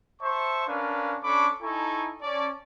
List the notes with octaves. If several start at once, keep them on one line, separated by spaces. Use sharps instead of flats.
C5 E5 A5 C#6
C#4 D4 A#4 B4 F5
C#4 D4 A4 B5 C#6 D6
D#4 E4 A4 G#5 A#5 C#6
C#4 D5 A5